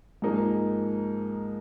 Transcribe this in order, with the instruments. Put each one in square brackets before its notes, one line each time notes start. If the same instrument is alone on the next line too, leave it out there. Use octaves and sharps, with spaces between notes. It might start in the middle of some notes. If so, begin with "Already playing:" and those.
[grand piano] G#2 F3 A#3 D#4 G#4